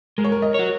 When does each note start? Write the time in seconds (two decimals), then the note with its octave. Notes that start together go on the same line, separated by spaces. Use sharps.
0.18 G#3 A#4
0.24 C#5
0.32 A#4
0.42 D#5
0.54 F#4 C#5